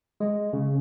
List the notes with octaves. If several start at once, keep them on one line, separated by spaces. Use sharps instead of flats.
G#3
C#3